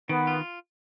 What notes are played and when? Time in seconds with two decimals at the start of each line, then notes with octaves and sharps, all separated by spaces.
0.09 D#3 B3
0.27 F4